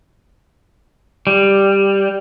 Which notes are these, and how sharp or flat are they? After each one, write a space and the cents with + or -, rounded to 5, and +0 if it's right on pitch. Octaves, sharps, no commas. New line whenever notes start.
G3 +5